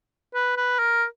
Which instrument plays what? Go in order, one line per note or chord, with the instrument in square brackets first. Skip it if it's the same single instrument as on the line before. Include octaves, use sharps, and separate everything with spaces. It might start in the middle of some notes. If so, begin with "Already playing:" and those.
[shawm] B4
B4
A#4